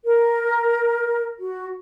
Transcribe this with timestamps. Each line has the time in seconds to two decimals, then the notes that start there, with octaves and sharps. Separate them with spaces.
0.05 A#4
1.39 F#4